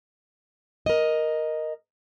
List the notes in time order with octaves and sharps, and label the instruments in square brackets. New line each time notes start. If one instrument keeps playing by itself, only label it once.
[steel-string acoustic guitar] A#4 D#5